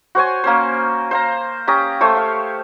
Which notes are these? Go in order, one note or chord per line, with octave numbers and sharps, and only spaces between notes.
F#4 C5 C#5 G#5
A#3 C#4 C5
C5 F5 A#5
C#4 G4 A#5 D#6
A3 C5 C#5
F5